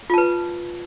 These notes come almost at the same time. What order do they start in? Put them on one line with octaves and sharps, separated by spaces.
F4 A5 B4